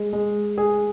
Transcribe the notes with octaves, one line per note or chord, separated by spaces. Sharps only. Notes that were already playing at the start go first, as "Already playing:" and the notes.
Already playing: G#3
G#3
G#4